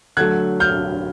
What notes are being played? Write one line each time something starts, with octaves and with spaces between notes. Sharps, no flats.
D3 F#3 A3 F#6 G#6
F6 G6